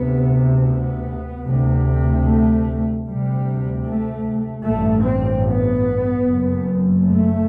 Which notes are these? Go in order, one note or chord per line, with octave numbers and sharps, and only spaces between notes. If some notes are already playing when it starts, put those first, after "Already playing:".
Already playing: D2 C3 B3
B3
D2 C3
A3
D2 C3 G3
A3
A1 G2 A3
C4
B3
F#1 F#2
A3